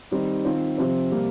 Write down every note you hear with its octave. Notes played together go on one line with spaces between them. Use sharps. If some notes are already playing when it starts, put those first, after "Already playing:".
D#3 G3 C4 D#4
D#3 C4 F4
C3 F3 C4
C3 G3 A#3